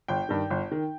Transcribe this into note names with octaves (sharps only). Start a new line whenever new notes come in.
G1 G5
G2 D#3
G1
D#3